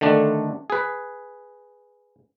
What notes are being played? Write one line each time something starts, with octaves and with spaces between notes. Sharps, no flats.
D3 D#3 A3 D4
G#4 B4